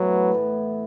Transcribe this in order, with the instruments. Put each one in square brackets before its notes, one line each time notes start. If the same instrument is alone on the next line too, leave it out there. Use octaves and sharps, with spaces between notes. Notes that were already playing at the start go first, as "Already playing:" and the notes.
Already playing: [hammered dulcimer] A2 E3 B3 [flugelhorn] F#3
[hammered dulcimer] A2 E3 B3